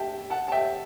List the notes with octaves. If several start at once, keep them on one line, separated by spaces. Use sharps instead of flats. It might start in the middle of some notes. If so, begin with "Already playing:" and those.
Already playing: E5 G5 A5
F#5 A5
A5
E5 G5